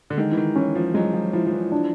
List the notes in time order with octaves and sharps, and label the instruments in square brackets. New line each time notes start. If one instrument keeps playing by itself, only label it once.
[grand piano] D3
[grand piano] D#3 [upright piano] G#3
[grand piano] E3
D#3
[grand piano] E3 [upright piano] C#4
[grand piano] F3
[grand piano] F#3 [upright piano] G#3
[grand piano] F3
[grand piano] F3 [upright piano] E4
[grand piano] F3
E3
[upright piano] D4